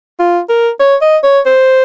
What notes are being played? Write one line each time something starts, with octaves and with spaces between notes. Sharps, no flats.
F4
A#4
C#5
D#5
C#5
C5